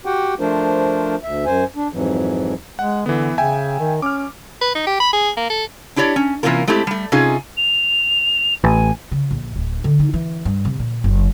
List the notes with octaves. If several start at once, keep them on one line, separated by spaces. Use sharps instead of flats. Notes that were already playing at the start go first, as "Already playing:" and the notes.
F#4 G4 F#5 G5
F3 A3 D4 F4 A#4 C5
D2 E5
F#2 C5 G#5
D4
F2 G#2 E3 F#3
G#3 F#5
D3 E3 B3
C#3 E5 G5 G#5
D#3
C#4 D6 F6
B4
D#4
G4
B5
G#4
A#3
A4
D4 E4 G4 C#5 D5
C#4
C3 E3 A#3 C#4 F4 A#4
G#3 A3 C4 E4 G4
G3 A3
C3 C#4 D#4 F4 G#4
F7
A1 G#5
C#3
A#1
D1
D3
D#4
E3
G2
C3
A#2
F#1